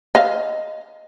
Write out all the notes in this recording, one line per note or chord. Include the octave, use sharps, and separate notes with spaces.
D#5 F5